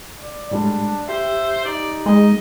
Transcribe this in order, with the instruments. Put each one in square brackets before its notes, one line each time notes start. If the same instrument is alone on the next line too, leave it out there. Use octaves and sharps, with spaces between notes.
[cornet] D5
[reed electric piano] A2 G3 G#3 [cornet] D4
[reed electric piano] G4 [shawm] C5 [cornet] E5
[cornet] D#4 [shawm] D5
[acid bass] G#3 [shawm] D#5